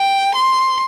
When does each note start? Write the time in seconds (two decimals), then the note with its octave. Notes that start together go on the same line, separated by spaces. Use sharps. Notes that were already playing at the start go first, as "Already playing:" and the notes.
Already playing: G5
0.36 C6